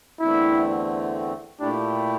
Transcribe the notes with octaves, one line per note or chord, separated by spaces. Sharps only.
E2 D3 A3 C4 E4
A#2 A3 D4 E4 G4